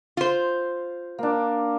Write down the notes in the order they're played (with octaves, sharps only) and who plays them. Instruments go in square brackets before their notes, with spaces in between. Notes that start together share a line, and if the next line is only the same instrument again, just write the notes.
[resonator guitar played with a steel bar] F4 C5
[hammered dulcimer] A#3 D4